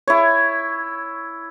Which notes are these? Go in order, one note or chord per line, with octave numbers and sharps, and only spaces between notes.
E4 C#5